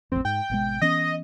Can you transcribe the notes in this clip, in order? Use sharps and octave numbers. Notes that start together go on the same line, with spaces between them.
A1 F2 C4
G#2 G5
G#1 B2 G#3
E3 B3 C#4 D#5 A#6